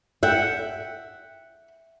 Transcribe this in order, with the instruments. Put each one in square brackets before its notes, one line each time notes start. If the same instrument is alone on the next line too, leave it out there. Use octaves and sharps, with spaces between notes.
[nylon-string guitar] E5 F#5 G5